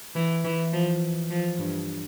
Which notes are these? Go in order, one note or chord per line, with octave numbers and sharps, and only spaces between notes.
E3
E3
F3
F3
G2